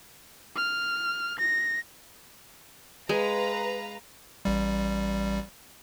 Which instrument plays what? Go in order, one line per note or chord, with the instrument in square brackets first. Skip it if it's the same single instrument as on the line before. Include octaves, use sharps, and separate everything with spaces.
[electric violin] F6
A#6
[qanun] G#3 [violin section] B4 F5 A#5
[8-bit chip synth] A1 G3